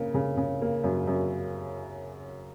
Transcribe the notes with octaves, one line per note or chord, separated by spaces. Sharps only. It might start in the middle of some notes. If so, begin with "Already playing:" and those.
Already playing: C#3 A#3 C#4
C#3
C#3
A#3
F#2
F#2